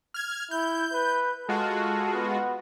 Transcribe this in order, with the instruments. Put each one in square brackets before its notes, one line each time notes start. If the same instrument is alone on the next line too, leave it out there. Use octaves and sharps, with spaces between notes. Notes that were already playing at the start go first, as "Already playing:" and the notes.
[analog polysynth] F6 G#6
[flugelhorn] E4 [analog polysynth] G6
[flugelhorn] B4
[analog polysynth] G#3 F4 F#4 [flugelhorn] A4
[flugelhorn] B3